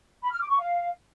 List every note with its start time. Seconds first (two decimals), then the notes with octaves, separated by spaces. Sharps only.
0.22 B5
0.31 F6
0.41 D6
0.50 C#6
0.59 F5